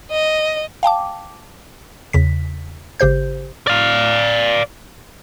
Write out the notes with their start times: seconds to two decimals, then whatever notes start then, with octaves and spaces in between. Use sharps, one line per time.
0.11 D#5
0.83 F5 G5 A5 D6
2.13 E2 C#3 B6
3.00 G#1 C#3 G4 C5 G6
3.67 D5 F5